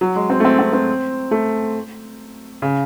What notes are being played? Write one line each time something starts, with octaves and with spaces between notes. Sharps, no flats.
F#3
G#3
C4
A3
C4
C4
C4
A3
C#3